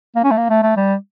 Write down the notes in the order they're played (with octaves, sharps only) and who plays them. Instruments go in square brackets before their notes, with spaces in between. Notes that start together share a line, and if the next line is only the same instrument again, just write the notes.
[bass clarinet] A#3
C#4
A3
A#3
A3
A3
G3